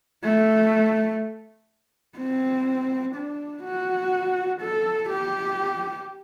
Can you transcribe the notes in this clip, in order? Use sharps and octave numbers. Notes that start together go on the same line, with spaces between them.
A3
C4
D4
F#4
A4
G4